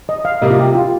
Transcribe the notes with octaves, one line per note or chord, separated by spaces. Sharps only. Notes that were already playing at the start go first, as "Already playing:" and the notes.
D#5
F5
C3 G3 A#3 D#5
F4
G4
F4